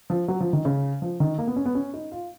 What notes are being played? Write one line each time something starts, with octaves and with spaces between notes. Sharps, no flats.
F3
F#3
F3
D#3
C#3
F3
D#3
A#3
B3
C#4
B3
C#4
D#4
F4